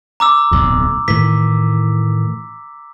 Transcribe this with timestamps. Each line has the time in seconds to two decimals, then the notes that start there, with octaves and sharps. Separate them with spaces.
0.20 A#5 D6 E6
0.51 D1 B1 F2
1.08 A2 D#3 E3 B6